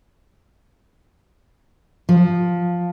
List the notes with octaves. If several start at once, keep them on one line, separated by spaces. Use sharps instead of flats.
F3